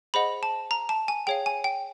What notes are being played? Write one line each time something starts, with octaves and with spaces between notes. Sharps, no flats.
G#4 C5 D#5 F#5 B5
A5
A#5
A5
G#5
G#4 C#5 F5 G5
G#5
G5